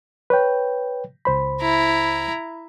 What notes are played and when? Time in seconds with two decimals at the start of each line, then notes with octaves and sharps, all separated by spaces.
0.30 B4 C#5 G5
1.25 C#2 C5 B5
1.61 E4 A#5